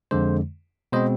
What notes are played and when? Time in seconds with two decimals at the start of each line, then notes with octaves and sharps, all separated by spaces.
0.11 F2 D3 G#3 C5
0.92 B2 G#3 C4 C5 D#5